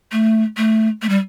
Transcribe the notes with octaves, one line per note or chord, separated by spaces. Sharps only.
A3
A3
A3
G3